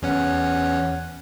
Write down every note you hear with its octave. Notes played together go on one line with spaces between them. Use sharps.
E2 C#4 F#5